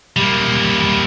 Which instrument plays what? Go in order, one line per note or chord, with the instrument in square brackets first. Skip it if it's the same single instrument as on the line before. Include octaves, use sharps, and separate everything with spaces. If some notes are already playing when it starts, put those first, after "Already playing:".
[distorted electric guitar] G3 A#3